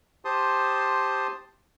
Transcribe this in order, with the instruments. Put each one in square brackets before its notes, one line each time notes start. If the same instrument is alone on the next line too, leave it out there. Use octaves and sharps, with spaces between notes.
[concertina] G4 C5 A5 C6 D#6